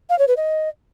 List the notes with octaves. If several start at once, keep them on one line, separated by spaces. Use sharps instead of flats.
F5
C#5
B4
D#5